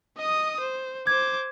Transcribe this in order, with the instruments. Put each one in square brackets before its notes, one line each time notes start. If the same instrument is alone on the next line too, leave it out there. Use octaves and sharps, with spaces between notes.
[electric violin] D#5 D#6
C5
[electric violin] C5 D6 [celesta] G#6